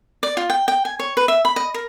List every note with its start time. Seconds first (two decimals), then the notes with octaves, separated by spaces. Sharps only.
0.23 D5
0.37 F4
0.50 G5
0.68 G5
0.85 G#5
0.99 C#5
1.17 B4
1.28 E5
1.45 B5
1.56 D#5
1.74 A#4